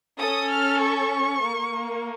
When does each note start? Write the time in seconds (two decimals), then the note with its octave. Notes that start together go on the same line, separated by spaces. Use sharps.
0.20 C#4 A4 D#6
0.52 F6
0.81 C#6
1.42 A#3